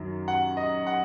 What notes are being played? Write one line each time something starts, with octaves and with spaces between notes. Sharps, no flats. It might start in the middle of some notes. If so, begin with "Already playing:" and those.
Already playing: F#2 D#3 F#3
F#5
D#5
F#5